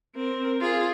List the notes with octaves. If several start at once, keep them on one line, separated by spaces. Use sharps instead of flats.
C4 A#4
F4 G#4